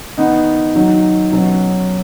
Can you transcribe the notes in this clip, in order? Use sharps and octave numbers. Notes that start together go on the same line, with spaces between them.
D#3 B3 D#4
D#3 F#3 D#4
B2 F#3 C#4